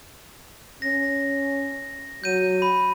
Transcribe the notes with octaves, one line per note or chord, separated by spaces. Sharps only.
C#4 A#6
F#3 G6 D#7
B5